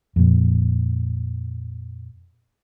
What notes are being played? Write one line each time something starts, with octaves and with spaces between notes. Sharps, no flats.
F2 A#2